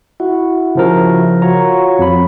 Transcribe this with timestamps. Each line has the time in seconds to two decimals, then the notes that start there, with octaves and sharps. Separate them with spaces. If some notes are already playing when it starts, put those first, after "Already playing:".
0.20 E4 F#4
0.75 C#3 F3 A#4
1.42 F4 F#4 C#5 A#5
1.99 F2 B5